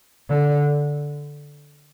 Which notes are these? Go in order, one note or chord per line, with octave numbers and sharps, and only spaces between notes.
D3